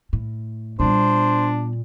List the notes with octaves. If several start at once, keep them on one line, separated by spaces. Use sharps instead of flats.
A2
A#2 G3 B3 D4 C5